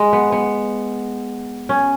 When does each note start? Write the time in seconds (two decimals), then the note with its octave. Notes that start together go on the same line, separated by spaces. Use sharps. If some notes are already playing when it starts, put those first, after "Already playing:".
Already playing: G#3
0.13 B3
0.32 B3
1.69 C#4